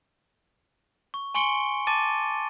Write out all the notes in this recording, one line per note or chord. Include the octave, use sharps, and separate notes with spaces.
C#6
G#5 C6 C#6 C#7 D7 G7
A5 D6 A6 D#7